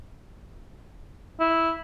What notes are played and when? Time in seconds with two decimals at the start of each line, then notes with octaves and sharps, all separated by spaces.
1.40 E4